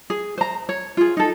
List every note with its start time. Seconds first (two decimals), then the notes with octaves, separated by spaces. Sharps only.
0.10 G#4
0.38 C5 A#5
0.69 C#5
0.97 F4 G#4
1.17 D#4 A4